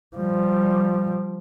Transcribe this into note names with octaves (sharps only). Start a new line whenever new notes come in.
F3 G3